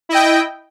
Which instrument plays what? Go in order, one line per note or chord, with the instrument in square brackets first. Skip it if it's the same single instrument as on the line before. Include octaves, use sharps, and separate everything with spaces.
[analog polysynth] E4
D#5
G5